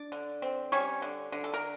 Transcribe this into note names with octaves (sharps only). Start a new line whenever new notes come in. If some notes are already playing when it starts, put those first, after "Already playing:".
Already playing: D4 D5
D3
C4
G3 C#4 C#5
D3
D3
A4
A#4